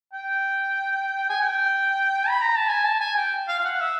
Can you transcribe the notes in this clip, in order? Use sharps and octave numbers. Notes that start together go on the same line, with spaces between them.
G5
G#5
G5
B5
A#5
A5
G#5
A5
G#5
G5
F5
F5
F#5
E5